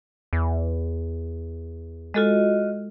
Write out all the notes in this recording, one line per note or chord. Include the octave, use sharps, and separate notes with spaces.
E2
G#3 F4 F#4 A4 D#5